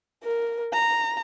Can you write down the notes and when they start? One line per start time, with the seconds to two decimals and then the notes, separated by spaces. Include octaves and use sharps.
0.24 A#4
0.73 A#5